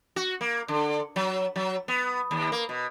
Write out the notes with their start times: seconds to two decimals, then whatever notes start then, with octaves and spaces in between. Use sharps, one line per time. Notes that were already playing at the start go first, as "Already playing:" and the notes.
0.16 F#4
0.41 A#3
0.68 D3
1.16 F#3
1.56 F#3
1.88 B3
2.31 D#2
2.52 A#3
2.69 B2